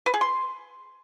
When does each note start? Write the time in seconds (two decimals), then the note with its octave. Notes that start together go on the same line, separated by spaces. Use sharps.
0.06 B4
0.14 G#4
0.21 C6